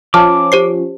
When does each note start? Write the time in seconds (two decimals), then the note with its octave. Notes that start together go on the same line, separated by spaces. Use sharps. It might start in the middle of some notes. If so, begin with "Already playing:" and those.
0.14 F3 C#4 A5 D6 F6
0.52 G4 C5 C7